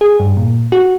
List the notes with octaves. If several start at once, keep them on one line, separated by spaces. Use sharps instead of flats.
G#4
G2
A#2
F#4